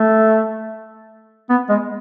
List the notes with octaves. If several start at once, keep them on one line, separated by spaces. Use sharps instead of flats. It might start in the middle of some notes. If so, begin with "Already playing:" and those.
Already playing: A3
B3
G#3